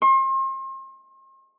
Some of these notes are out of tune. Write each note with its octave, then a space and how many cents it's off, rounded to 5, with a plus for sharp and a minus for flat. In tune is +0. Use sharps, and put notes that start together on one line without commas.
C6 +40